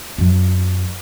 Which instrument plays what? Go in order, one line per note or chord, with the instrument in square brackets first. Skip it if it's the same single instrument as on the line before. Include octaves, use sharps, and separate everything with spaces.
[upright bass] F#2 F#3